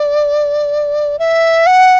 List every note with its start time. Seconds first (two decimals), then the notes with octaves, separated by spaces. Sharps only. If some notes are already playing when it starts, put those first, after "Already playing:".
Already playing: D5
1.19 E5
1.66 F#5